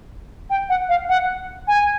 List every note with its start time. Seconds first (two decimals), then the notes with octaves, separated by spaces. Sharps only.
0.50 G5
0.69 F#5
0.89 F5
1.09 F#5
1.68 G#5